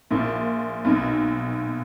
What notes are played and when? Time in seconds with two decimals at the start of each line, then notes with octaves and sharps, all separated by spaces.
0.11 A#1 A#2
0.85 B1 B2